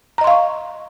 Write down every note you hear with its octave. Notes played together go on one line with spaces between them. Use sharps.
D#5 F5 A#5 C6 C#6